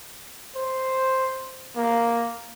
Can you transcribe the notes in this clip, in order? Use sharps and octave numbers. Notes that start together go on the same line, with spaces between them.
C5
A#3